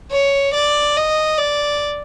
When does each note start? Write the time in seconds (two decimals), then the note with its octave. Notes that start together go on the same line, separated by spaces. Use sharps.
0.11 C#5
0.54 D5
0.96 D#5
1.38 D5